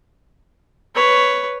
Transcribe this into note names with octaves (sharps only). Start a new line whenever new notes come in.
B4 C#5